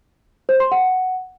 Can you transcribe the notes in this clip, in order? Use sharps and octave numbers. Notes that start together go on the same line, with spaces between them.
C5
C6
F#5